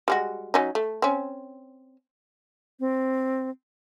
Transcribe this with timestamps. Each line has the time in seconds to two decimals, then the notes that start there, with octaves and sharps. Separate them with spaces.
0.08 G3 G#3 F#4
0.54 F#3 C#4 D#4
0.75 A3
1.02 C4 C#4
2.80 C4